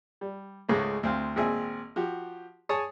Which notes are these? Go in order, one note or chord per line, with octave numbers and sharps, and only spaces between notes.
G3
C#2 G#2 C#3 G#3 A3
D2 C4 F5
G#1 A#2 C4 G#4 E5
F3 F#4 G4
G#4 C#5 A5 D#6